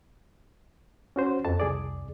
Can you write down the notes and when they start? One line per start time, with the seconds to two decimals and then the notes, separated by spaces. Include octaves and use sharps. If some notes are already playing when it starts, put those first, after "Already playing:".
1.16 C#4 F#4 C5
1.45 F2 A5
1.60 C2 G#4 D5